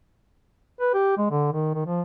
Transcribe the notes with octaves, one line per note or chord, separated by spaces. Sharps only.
B4
G4
G#3
D3
D#3
D#3
F3